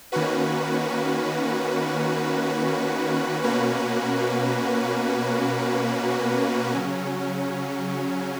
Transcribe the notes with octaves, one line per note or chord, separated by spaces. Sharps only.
D#3 A#3 C#4 F#4 B4
B2 A#3 C#4 F#4 B4
C#3 F#3 C#4